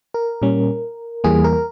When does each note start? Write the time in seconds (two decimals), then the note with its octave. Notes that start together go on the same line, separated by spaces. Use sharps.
0.14 A#4
0.42 A#2 G3 C#4
1.24 E2 E3 G3 A#3 G#4
1.44 A#4